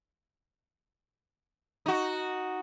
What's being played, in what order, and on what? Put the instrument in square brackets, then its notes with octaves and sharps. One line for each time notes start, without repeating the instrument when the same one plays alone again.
[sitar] D#4 F#4